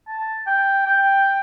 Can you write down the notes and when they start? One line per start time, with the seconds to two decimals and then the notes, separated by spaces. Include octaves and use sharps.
0.07 A5
0.47 G5
0.86 G5